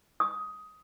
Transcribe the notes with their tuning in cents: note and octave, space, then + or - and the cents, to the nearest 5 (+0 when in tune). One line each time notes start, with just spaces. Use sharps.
D#6 +10